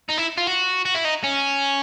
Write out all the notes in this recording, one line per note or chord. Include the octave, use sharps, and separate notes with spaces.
D#4
E4
F4
F#4
F#4
E4
D#4
C#4